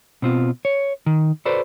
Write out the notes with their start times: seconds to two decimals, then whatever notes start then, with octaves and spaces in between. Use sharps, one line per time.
0.22 B2 C4 F4
0.65 C#5
1.06 D#3
1.45 F#4 A4 B4 C5 D5